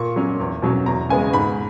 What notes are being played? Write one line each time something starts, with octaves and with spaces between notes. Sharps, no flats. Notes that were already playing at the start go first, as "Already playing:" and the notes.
Already playing: A#2 C#6
F#3 C#4
E2
B2 F#3 C#4
E2 A#5
C#3 G#3 B3 G#5
G#2 B5